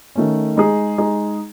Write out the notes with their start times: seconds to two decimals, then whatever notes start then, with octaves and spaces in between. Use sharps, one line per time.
0.16 D#3 A3 C#4
0.57 G#3 D#4 G#4
0.98 G#3 D#4 G#4